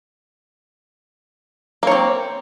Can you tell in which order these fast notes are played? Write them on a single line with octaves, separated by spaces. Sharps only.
A#3 C#5 C4